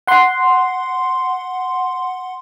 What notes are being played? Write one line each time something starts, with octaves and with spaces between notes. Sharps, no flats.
F#5 C6